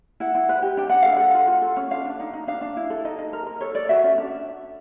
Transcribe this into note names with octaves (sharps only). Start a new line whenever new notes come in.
E4 F#5
E4
B4
G4
D4 G5
D4 F#5
A4 F5
A4 F#5
F4
F4
A4
C#4
D4 F5
D4
D#4
D#4
D4 F5
D4
E4
A4
D#4 D#5
D#4
A#4
A#4
A4 C#5
A4 D5
F#4 E5
C#4
D4